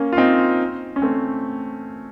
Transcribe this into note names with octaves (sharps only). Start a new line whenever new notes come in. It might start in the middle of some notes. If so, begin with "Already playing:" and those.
Already playing: A#3 C#4
F4
C4 D#4
C#4
A3 C4